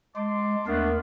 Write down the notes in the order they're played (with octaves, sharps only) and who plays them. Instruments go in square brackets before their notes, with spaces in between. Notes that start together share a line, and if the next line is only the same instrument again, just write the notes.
[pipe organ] G#3 [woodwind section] A5 C6 D6
[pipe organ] D#2 A#4 [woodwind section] A3 B3 D4